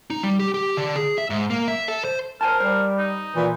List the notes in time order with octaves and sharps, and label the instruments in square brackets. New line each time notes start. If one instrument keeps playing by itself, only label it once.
[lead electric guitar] D#4
G3
G4
G4
D3
G#4
E5
G#2
A#3
E5
A4
C5
[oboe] A#4 [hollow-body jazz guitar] C5 G#5 A5
[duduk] G3 [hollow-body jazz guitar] C5
[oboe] D#4
[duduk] A#2 [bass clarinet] E3